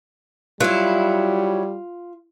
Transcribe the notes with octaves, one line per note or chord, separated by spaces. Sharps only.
F#3 G3 E4 F4